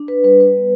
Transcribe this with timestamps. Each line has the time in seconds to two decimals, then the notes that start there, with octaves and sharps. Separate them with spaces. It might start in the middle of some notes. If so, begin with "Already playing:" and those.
Already playing: D4
0.08 B4
0.24 G3 B4
0.40 B4
0.57 B3